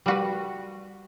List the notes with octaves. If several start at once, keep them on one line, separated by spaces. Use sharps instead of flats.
G3 F#4 B4